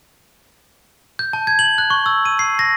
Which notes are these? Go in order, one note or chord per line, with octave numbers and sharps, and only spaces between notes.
G6
A5
G#6
F#7
F#6
C#6
E6
D#7
C7
A#6